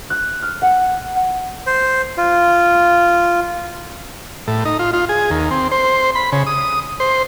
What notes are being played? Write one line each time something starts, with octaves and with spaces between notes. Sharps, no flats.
F#6
F6
F#5
C5
F4
A2
D#4
F4
F4
G#4
D#2
C4
C5
B5
C#3
D#6
C5